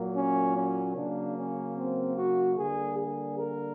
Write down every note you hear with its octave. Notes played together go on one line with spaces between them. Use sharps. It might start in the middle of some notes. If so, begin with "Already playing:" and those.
Already playing: A#2 F#3 A#3
C#4
C#4
C#3 F#3 A#3 D4
C#4
C4
F#4
D3 G3 A#3 G#4
G#4
A#4